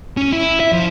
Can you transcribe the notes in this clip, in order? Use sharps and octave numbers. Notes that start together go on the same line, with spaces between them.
C#4
E4
E5
F3